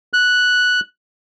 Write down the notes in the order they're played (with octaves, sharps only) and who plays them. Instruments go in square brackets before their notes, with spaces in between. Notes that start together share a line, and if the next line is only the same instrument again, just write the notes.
[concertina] F#6